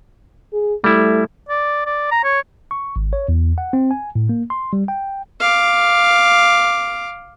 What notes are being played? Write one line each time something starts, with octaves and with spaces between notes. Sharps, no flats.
G#4
G3 A3 E4
D5
D5
A#5
C#5
C#6
G#1
C#5
E2
F#5
C4
G#5
A2
A#3
C6
G3
G5
F5 D6